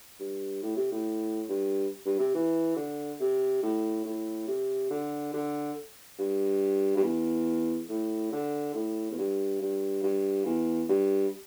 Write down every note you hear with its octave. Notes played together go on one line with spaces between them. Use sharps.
G2
A2
C3
A2
G2
G2
C3
E3
D3
C3
A2
A2
C3
D3
D3
G2
G2
E2
A2
D3
A2
E2
G2
G2
G2
E2
G2